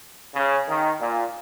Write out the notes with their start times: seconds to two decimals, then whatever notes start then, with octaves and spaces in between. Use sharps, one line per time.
0.34 C#3
0.68 D#3
1.01 A#2